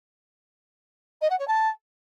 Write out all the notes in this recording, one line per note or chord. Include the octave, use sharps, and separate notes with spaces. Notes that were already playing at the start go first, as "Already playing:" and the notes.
D#5
F#5
C#5
A5